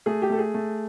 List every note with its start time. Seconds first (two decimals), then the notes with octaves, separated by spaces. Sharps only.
0.06 A3 G#4
0.22 G4
0.30 A3 A4
0.38 G#4
0.54 A3